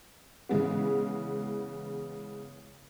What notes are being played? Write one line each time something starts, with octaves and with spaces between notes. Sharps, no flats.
C#3 E3 G#3 B3